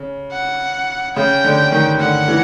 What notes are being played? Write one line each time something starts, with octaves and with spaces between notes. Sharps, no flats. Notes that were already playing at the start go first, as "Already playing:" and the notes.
Already playing: C#3
F#5
C#3 G5
D3
D#3
D3 F#5
E3